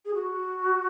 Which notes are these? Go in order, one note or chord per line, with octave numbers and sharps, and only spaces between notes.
G#4
F#4